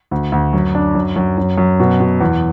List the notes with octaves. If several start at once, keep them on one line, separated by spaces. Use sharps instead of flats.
D2
D2
F#2
D4
F#2
F#2
F#2
F#2
B2
B2
E2